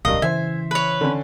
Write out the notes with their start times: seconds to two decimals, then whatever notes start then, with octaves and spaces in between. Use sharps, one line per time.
0.05 D1 B1 G2 A#4 D#5 F5
0.22 C#3 E3 C5 E5 G#5
0.71 B4 C#5
1.01 D3 C#4